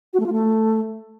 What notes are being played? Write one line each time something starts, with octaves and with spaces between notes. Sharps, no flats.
F#4
A3
F4
A3